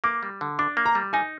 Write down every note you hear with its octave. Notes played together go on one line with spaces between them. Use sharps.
A#3 D6
G3
D3
D4 D6
A#3
A#5
G3
D#4 G#5